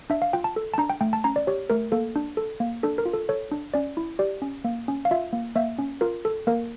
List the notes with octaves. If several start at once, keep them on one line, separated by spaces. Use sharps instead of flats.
D4 E5
F5
F4 G5
A5
A4
A5
D4 A#5
G5
A3 G5
A5
C#4 A#5
D5
G4 C#5
A3 A#4
A#3 A4
D4
A4
A#3
D4 A4
A#4
F4
A4
A4 C#5
D4
C#4 D5
E4
G4 D5
C#4
A#3
C#4
F5
F4 E5
A#3
A#3 E5
C#4
F4 A#4
A4
A#3 A#4